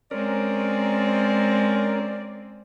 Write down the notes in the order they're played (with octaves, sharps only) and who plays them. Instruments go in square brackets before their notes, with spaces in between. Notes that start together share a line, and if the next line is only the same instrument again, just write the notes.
[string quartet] G#3 C4 [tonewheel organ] C#4 A#4 [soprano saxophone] D5